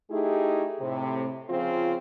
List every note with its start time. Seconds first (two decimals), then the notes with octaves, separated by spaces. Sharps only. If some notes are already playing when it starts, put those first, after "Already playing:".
0.10 A3 D#4 E4 G4 G#4
0.80 A2 C3
1.50 C#3 F3 C4 F4